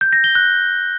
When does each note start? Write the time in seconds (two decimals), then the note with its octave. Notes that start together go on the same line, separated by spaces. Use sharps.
0.01 G6
0.13 A#6
0.24 G7
0.35 F#6